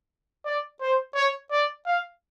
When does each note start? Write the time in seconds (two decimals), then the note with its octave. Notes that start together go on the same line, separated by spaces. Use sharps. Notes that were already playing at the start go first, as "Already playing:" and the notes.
0.45 D5
0.81 C5
1.15 C#5
1.51 D5
1.86 F5